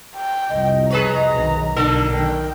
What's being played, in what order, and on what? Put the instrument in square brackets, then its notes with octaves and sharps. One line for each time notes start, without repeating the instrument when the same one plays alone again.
[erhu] G5
[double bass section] C2 F2 [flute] D#5
[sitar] G#4 B4 C#5 [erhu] A#5
[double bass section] B1 D#3
[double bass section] B1 [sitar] D3 D4 A4 [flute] A#4
[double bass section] D#3 [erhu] G5